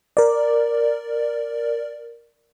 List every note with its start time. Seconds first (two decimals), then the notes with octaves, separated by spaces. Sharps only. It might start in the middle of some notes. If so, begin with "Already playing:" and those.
0.17 A#4 D5